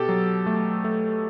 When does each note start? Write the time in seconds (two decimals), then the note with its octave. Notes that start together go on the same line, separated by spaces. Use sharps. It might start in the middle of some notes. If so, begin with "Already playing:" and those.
Already playing: B2 G4 A4
0.09 F#3
0.46 A3
0.84 A3